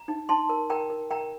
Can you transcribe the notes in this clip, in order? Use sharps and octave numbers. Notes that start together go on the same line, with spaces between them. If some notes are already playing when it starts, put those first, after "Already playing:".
Already playing: A#5
D#4
D#4 A5 C6
A#4
A#4 G5 A#5
A#4
A#4 G5 A#5